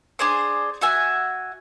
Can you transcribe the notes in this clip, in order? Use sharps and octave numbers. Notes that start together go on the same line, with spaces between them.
D4 G#4 C5
F#4 E5 G#5